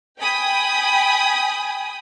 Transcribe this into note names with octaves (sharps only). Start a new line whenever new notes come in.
G5 G#5 B5 D#6